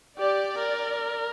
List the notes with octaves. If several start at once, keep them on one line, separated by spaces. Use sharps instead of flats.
G4 D5
A#4